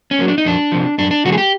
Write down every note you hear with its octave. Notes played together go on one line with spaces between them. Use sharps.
C#4
F#3 A#3
D4
D#4
F2 D4
C3 F3
F#2 D4
D4
C#3 F3 A3 F#4
G#4
G4